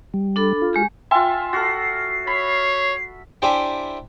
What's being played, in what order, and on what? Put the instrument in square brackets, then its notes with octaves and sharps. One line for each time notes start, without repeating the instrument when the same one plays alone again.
[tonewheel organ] G3
[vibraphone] D4 A4 B5
[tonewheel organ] F4
[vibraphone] G#3 G4 G#4
[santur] F4 E5 [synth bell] G5 G#5 C6
[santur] F#4 A4 [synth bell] F6 A6 [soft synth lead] C7
[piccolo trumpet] C#5 [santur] B5
[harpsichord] D4 E4 G4 C5 G5 G#5